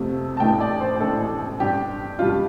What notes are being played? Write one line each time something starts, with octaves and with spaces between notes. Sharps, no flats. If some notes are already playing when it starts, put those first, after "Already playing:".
Already playing: F2 C3 A3
A5
A1 A2 A3 D4 G5
D5
C5
A1 A2 A3 D4 A4
G2 G3 D4 G4
G2 G3 D4 F4